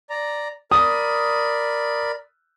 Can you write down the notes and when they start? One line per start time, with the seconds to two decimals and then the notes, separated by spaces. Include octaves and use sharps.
0.10 D5 A#5
0.71 A#4 D5 B5 D#6